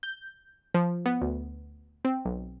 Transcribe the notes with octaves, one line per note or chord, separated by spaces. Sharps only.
G6
F3
B3
D2
C4
B1